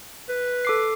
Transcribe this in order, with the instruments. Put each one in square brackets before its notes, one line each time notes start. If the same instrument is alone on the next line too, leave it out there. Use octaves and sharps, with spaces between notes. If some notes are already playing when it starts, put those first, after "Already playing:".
[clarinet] B4
[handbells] A4 D6 C7